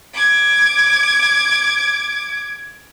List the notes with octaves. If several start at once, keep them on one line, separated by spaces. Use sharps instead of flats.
D6 G#6